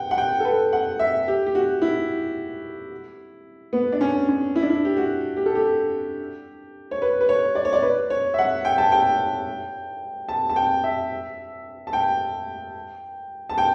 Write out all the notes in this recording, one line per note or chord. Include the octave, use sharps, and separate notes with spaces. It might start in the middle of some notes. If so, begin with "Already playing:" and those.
Already playing: F#5 G5
F#5
G5
A4
B4
F#5
E5
G4
G4
F#4
E4
B3
D4
C#4
C#4
E4
D4
E4
G4
F#4
G4
A4
G4
C#5
B4
B4
C#5
D5
C#5
D5
B4
C#5
E5
F#5
G5
A5
G5
A5
A5
G5
E5
A5
G5
A5
G5